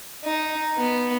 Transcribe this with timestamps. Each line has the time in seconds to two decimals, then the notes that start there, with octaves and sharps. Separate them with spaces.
0.24 D#4
0.77 B3